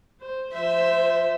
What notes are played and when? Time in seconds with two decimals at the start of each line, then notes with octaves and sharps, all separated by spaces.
0.20 C5
0.52 F3 C5 E5